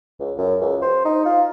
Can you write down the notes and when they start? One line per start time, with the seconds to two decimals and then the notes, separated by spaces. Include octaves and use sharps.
0.19 C#2
0.37 F#2
0.61 C#2
0.82 C5
1.05 D#4
1.25 F4